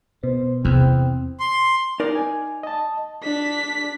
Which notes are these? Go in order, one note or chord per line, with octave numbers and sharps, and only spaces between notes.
B2 C5
E2 C3 C4
C6
D#4 A#4 D5
G#5
D#5 A5
D4 B6